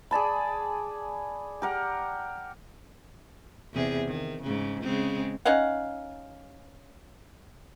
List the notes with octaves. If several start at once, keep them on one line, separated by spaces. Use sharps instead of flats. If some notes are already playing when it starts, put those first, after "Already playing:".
G#4 D5 A5 B5
G4 A#4 F#5
E2 C3 G#4
D#3
G#2 C#3
C#3 G#3 C4
C#4 D#4 F5 F#5